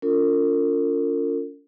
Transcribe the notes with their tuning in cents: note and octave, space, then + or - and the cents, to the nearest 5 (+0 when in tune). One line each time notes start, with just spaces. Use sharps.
C#4 +45 F4 +0 A#4 -45